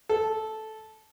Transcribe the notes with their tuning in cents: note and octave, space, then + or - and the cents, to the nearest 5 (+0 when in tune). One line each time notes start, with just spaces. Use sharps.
A4 -10